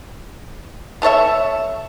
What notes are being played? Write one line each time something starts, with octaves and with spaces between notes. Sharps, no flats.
B3 A4 C#5 E5